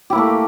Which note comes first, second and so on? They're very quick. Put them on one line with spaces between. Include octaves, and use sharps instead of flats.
G4 E4 A#3 A3